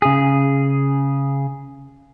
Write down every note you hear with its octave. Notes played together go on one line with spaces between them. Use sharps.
C#3 G#4